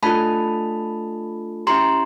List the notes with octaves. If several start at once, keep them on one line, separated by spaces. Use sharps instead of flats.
A3 D4 F4 A4 A5 B5
C#4 E4 G4 A#5 C6